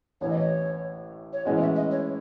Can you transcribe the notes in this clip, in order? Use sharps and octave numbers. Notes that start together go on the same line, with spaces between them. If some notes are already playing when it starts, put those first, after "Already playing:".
A1 A2 E3 C#5
D#5
C#5
C#5
A2 E3 G#3 C#4 F#4 D#5
E5
D#5
C#5